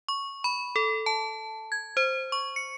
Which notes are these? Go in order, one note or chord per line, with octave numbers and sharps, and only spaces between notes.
C#6
B5
A4
A5
G#6
C5
C#6
C#7